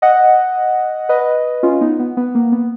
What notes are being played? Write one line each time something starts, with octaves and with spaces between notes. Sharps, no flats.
D#5 F#5
B4 D#5
C#4 F4
B3 D#4
B3
B3
A#3
B3